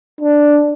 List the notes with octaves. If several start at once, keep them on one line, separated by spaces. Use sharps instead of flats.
D4